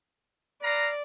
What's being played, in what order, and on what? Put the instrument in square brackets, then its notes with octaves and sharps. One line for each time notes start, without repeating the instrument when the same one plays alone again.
[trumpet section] B4 F5 A#5 [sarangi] D5